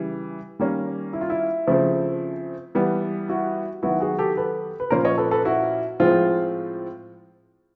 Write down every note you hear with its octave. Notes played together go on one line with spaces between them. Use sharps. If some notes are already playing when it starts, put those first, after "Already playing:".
Already playing: C#3 E3 G3
D#3 G3 A#3 C#4
E4
F4
E4
C#3 F3 A3 C4
E3 G3 B3
E4 F#4
D#3 F#3 B3 E4 F#4
F#4 G#4
G4 A4
A4 B4
B4
A#2 F3 A#3 C#4 A#4 C5
C#5 D#5
A4 B4
A4 B4
E4 F#4
A2 F3 G#3 C4 F4